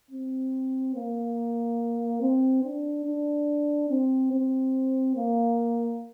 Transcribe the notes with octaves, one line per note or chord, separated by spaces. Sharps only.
C4
A#3
C4
D4
D4
C4
C4
A#3